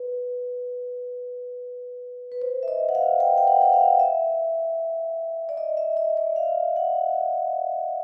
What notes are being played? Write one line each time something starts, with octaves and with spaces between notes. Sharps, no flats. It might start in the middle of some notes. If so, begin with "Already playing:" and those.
Already playing: B4
B4
C5
E5
D#5
F#5
F5
G5
G5
F#5
F#5
F5
E5
D5
D#5
E5
D#5
D5
F5
F#5